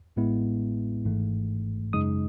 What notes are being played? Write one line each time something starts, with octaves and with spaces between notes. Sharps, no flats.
A1 A2 G#3 B3 E4
G#1 G#2 E3 A3
F#2 C#3 G#3 D#4 D#6